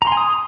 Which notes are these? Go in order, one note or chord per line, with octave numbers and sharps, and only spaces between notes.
A#5
C6
G#5
D#6